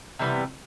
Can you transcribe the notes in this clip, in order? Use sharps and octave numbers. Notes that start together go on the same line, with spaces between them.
C3 E3 G3 B3